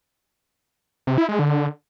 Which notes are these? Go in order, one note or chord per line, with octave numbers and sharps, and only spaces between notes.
C3
E4
G#3
D3